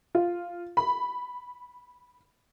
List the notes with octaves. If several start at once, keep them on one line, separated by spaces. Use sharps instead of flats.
F4
B5